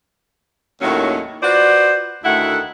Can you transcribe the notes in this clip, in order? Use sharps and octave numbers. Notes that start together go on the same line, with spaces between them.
D#2 A2 D#3 F#3 A#3 C#4
F4 F#4 B4 C5 D5
D2 D#3 A3 E4 F#5